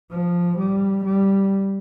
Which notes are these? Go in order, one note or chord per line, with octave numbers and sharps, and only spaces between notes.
F3
G3
G3